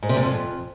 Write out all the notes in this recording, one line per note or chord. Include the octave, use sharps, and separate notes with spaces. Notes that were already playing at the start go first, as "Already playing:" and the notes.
G#2
C3
G#2
F2